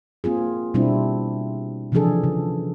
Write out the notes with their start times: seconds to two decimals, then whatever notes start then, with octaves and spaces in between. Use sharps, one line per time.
0.24 A#3 C4 F4 G#4
0.74 B2 G3 C4 D4 E4
1.92 C3 E3 F3 D4 G#4 A4
2.24 C#3